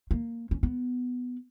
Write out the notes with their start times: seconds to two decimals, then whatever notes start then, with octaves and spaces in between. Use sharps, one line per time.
0.11 A#3
0.51 C#4
0.63 B3